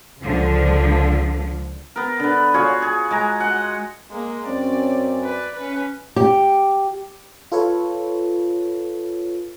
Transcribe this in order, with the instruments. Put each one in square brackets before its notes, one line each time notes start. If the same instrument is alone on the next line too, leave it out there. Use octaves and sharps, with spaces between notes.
[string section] C#2 D3 F3
[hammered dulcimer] B3 A#4
D3 B4
F4 F#4 G#4 C#5
G#4
G#3 G#5 A#5
D#5 F#5
[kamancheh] G#3 A#3
[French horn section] F#2 C4 C#4 [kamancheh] D5
[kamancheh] B4 D5
C#4 B4
[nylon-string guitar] G4
[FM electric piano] F4 A4 B4 C#5